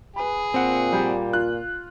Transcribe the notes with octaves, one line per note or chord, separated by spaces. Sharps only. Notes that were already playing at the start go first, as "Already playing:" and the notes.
G#4 B4 B5
A#2 C4 F#5
G3 A#3 G4
F4 F#6